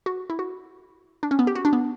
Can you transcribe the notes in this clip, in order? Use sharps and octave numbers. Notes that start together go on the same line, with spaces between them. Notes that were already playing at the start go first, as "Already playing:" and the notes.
F#4
E4
F#4
D4
C#4
B3
G4
F#4
D4
B3